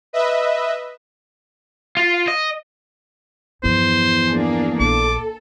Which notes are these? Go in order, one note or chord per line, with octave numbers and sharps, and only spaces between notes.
B4 D#5 E5
F4
D#5
E2 G2 F3 C5
A#3 D4 G#4
A#1 A4 D6